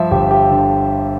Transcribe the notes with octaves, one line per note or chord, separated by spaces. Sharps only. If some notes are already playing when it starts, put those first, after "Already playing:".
Already playing: G2 F3 E5
G1 G4
G4
D3